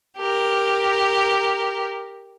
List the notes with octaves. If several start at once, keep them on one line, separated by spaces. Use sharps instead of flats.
G4 A#4